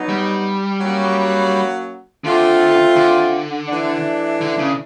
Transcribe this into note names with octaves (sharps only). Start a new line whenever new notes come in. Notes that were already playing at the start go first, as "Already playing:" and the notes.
Already playing: F#3 B3 D#4
G3
F#3 A#3 C#4 F#4
D3 A3 C4 F4
D3
E3 A3 D4
D3
C#3